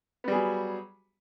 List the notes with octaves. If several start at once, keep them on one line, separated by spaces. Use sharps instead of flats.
F#3 G3 B3 G#4